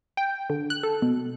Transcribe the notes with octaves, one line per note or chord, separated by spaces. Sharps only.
G5
D3
F#6
A4
B2